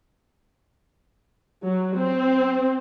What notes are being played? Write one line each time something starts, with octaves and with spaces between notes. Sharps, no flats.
F#3
C4